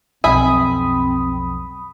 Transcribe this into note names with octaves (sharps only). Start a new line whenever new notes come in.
B1 F2 C4 E5 G#5 B5 D#6